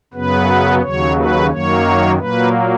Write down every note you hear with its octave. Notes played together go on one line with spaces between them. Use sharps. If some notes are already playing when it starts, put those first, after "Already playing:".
F#2 C#3 F#3 B3 B4
D#2 C#3 F#3 C#5
B4
F#2 D#3 F#3 A#3 C#5
A#2 F#3 A#3 B4